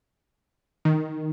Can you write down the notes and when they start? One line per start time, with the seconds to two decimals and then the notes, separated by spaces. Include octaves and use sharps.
0.85 D#3